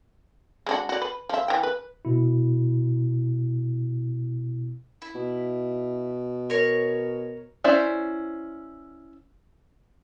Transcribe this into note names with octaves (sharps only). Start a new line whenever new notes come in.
G#3 D4 F#4
F#4 D5
B4
F3 E5
E3 G5
B4
B2 E4
E4
B2
A#4 C#5
C#4 E4 C5 D5 E5